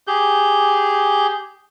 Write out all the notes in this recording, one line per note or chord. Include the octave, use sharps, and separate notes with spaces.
G4 G#4 G6